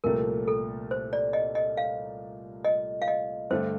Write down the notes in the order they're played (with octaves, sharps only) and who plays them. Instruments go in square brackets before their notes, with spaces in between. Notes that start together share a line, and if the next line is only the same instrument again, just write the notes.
[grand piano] C2 A#2 F3 A3 [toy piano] A#4
[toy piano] A4
C5
D5
D#5
D#5
F5
D#5
F5
D#5
[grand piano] G2 D3 A3 [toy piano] C5